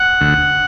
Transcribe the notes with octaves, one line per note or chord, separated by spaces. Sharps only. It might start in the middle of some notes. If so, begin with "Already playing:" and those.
Already playing: F#5
D2